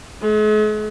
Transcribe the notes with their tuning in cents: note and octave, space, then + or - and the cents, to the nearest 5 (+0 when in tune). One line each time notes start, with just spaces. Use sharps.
G#3 +45